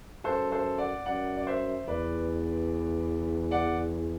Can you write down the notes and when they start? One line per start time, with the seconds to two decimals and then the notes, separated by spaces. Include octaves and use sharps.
0.24 F#2 A4 C5
0.52 A4 C5
0.78 D5 F#5
1.06 F#2 D5 F#5
1.37 D5
1.47 C5 E5
1.88 E2 B4 D5
3.51 D5 F#5